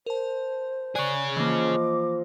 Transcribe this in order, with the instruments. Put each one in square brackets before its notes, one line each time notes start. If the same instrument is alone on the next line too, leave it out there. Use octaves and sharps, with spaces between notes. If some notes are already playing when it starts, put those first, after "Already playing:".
[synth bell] A#4 A5 [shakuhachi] C5
[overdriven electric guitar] G#4 C#5 [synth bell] D5 F#6 D7
[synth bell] E3 A#3 [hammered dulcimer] F3 D#5 [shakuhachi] D6